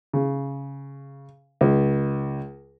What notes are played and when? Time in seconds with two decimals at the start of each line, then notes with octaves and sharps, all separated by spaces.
0.13 C#3
1.61 C#2